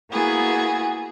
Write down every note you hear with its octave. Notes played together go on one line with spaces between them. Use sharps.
A#3 B3 E4 F#4 G#4